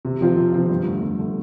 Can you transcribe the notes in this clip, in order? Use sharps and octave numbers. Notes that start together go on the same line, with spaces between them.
C3
F3 C4 F4
C3
F3 C4 F4
G2
D3 A3
G2
D3 A3